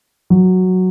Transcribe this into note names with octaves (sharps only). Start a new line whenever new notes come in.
F#3